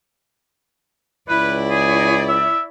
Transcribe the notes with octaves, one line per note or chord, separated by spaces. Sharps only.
C#2 E4 B4 D5
G#4
E5